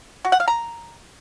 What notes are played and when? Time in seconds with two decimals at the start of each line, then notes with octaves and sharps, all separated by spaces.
0.25 F#4
0.32 F#5
0.40 F5
0.48 A#5